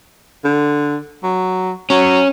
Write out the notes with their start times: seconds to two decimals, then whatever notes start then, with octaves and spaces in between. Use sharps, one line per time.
0.44 D3
1.23 F#3
1.90 F#3 C#4